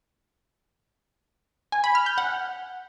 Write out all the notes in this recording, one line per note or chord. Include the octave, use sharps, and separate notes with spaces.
G#5
B5
F6
G6
F#5